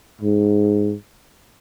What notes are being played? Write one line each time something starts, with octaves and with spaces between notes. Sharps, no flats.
G#2